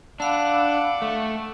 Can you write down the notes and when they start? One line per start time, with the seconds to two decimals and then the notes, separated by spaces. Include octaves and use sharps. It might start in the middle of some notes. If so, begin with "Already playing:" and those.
0.20 D4 F5 F#5 B5 D6 E6
1.02 A3